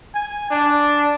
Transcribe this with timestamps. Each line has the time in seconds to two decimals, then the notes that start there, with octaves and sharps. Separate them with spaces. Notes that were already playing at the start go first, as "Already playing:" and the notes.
0.15 G#5
0.51 D4